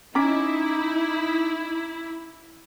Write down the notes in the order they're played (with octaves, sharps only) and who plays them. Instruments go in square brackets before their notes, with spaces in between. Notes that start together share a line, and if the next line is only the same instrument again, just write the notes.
[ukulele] C#4 [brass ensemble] D#4 [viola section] E4 [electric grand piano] A#5 D6 B6